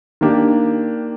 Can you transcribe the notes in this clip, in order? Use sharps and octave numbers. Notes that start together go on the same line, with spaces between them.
D#3 A#3 D4 G4